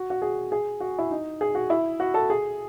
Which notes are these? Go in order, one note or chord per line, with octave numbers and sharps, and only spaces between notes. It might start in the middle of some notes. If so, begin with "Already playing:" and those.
Already playing: F#4
F#4
G#4
G#4
F#4
E4
D#4
G#4
F#4
E4
F#4
A4
G#4